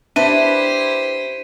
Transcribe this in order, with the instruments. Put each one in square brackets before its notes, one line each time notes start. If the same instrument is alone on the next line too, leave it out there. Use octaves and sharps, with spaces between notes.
[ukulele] D4 [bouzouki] E4 B4 [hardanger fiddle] G4 C5 [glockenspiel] B6 D#7